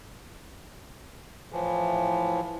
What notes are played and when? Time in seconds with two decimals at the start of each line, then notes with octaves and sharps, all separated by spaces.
1.52 A2 E3 F3